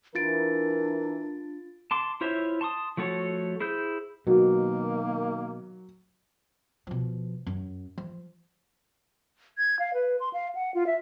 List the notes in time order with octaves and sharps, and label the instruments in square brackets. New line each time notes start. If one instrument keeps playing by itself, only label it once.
[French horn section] E3 A#4 [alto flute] D4 [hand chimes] F4 A6 D7
[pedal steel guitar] A5 C6 D6
E4 F4 C5 C#5 E5
A5 C6 C#6 D#6
F3 A3 F#4 A4 C#5
E4 G#4 C5 G6
[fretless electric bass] B2 [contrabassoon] D#3 [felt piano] F#3 [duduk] A#3
[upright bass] B2 F3
F#2
F3
[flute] G#6
F5
B4
C6
F5
F#5
F4
E5